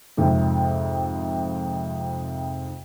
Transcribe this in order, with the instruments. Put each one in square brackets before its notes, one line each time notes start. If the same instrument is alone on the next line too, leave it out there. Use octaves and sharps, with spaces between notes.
[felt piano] F2 G#2 C3